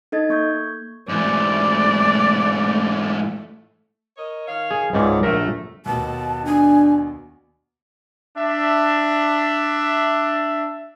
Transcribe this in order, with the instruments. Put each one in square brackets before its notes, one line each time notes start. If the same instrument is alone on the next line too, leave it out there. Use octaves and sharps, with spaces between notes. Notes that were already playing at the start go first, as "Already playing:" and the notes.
[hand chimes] D#4 A4 D#5 G#6 A6
A#3 C#6 G6 G#6
[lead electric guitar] G#2 E3 [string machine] A3 [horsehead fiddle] D5
[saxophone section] A#4 C#5 D#5
D#3 C#5 F5
[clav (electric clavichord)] G#4
[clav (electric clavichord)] C#2 G#2 C#3 [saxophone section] C#4 C#5 D5
[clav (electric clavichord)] A#1 A#4 [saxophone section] F#3 A3
[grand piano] D#2 B2 [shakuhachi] A5
[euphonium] D4 [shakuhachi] G#5
[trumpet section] D4 E5